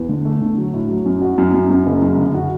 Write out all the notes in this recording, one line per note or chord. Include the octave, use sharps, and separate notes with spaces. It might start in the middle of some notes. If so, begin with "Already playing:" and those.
Already playing: E2
D3
A3
D3
F#3
A2
F#3
F#2
F#4
F#2
F#2
F#2
F#1
F#2
D3
F#4